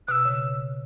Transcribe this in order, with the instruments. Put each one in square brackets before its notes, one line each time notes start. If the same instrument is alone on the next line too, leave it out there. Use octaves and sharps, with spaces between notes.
[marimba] B2 [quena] E6 F#6
[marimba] C#3
[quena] E6